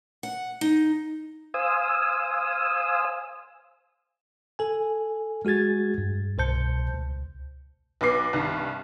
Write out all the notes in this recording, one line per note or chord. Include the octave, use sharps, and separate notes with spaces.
F#5
D#4
C5 F5 G#5 D#6 E6
A4 G#5
G#3 F#4 G#4 G#6 A6
G2
C2 B2 C5 A5 G6 C#7
C#2
B1 B3 B4 D6 C7
C2 G2 D#3